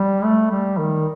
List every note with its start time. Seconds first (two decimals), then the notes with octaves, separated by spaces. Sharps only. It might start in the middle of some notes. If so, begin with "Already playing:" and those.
Already playing: G3
0.24 A3
0.51 G3
0.78 D#3